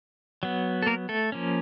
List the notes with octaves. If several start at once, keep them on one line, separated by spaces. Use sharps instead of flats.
F#3 B3
A4
A#3 A#4
A3 A4
F3 A#3 C#4